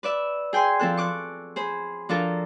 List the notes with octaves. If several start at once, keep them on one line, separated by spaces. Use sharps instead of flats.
B4 D5 E5
G#4 G5 G#5 C6
F3 C4 A4 F#6
C#6 D6 F#6
G#4 C5 B5
F3 D4 F4 A4 A#4